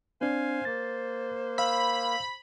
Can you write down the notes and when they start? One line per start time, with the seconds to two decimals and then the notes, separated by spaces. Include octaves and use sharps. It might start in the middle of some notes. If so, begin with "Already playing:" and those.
0.21 C4 D4 C5 F5 G#5
0.65 A#3 A6
1.58 F5 B5 E6